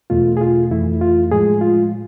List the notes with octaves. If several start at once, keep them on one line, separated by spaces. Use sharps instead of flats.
E2 B2 A3 F4
G#4
F4
F2 E3 A3 E4
F4
A2 F3 G#3 G#4
F4